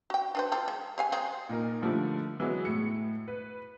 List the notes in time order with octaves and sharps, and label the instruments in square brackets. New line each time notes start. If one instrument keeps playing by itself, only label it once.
[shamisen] F#4 G5
D4 B4 C5
F4 G4 A4
G#3
G4 F5 G#5
F#3 G#3 C4
[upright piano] A#2 D#4 A#4
D3 F3 G3 A3
E3 F#3 G#3 B3
A2 C#7
B4